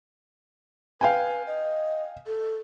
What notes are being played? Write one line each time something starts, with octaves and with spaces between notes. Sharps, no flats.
B4 F5 G5 G#5
D#5
A4